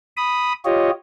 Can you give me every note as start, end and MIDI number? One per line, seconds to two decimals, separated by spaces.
0.17 0.53 83
0.17 0.53 87
0.65 0.91 65
0.65 0.91 67
0.65 0.91 73
0.65 0.91 75